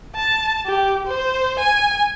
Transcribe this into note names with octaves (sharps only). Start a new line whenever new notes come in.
A5
G4
C5
G#5